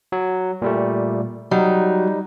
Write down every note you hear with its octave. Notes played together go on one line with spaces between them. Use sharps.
F#3
A#2 G3 A3
F#3 G3 D#4